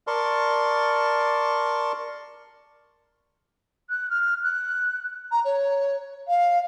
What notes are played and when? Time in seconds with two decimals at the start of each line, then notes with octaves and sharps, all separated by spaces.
0.07 A#4 D5 A5 C6 C#6
3.89 F#6
4.10 F6
4.43 F#6
5.31 A#5
5.44 C#5
6.27 F5